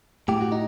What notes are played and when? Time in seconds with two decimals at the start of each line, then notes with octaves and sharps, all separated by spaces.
0.28 A2 G4
0.41 F#4
0.52 D#4